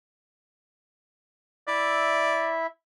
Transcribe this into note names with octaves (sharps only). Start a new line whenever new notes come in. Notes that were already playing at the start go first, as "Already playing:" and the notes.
E4 D5 E5